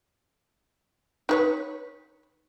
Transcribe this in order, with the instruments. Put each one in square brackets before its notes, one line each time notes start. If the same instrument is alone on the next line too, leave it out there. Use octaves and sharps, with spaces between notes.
[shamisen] D#4 B4 C#5